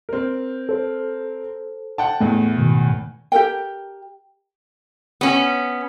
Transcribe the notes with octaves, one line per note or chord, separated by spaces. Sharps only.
C4 A#4
A4 C5
F#5 G5 A5
E2 A2 A3
G#2 B2 D#3
G4 A4 A#4 G5
B3 C#4